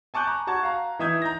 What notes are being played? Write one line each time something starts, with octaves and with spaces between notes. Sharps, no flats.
G#5 A5 C#6 D6 F#6 G6
A#5
F#4 A5 C#6 G#6
F5 A#5
E3 D#4 E5 D#6 G6 G#6
A#5 G6 A#6